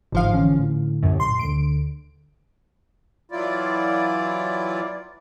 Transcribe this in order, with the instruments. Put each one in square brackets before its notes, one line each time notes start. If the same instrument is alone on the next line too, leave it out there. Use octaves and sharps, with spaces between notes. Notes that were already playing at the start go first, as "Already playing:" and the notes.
[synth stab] G1 F3 F5 [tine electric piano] G#2
[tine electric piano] D3 E3 C#4
A2 D3
[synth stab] C2 F#2
[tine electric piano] A#2 [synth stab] C6
[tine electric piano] D2 D3 [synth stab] D7
[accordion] E3 F#3 E4 F4 D5